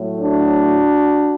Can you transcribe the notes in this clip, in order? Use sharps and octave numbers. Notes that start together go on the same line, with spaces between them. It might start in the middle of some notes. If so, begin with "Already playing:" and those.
Already playing: A2 F#3 A3
D4 F#4